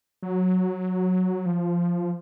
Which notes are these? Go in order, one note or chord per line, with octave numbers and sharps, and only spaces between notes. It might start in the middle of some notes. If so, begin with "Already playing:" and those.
F#3
F3